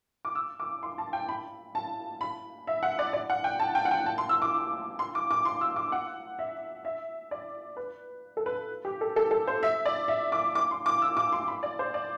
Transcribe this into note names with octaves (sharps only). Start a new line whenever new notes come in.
D6
E6
D6
C6
A5
G5
B5
A5
B5
E5
F#5
D5
D5
F#5
G5
A5
G5
F#5
G5
A5
C6
E6
D6
C6
D6
D6
C6
E6
D6
F#5
E5
E5
D5
B4
A4
B4
G4
A4
A4
A4
C5
E5
D5
E5
D6
D6
C6
D6
E6
D6
C6
B5
D5
C5
D5